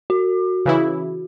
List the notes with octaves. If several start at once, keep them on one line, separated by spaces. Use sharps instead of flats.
F#4
C#3 E3 E4